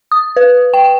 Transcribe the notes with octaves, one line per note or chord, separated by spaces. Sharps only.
D#6
B4
G5